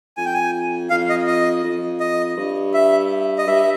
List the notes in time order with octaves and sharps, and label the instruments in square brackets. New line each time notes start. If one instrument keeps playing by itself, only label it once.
[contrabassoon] F2 [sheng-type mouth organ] G#5
[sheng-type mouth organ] G5
G#5
[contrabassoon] F2 [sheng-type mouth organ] F5
[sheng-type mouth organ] D#5
D#5
[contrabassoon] F2
[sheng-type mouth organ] D#5
[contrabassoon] G2
[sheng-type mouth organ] E5
D#5
[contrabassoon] G2 [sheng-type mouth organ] E5